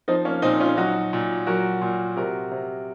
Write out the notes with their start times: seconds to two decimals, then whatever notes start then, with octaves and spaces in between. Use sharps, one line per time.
0.08 F3 C4 D#4
0.25 A#3 C#4
0.42 A#2 C4 D#4
0.60 C#4 F4
0.77 F#3 D#4 F#4
1.13 A#2
1.47 F#3 F#4 A#4
1.82 A#2
2.16 C3 F#4 A#4
2.51 C3